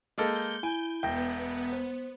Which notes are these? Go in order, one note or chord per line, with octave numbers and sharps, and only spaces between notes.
G#3 A#3 A4 G6
E4 G#5 B5 D7
E1 B3 E5 G5 A#6
C5